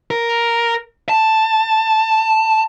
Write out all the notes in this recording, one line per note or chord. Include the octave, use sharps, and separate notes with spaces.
A#4
A5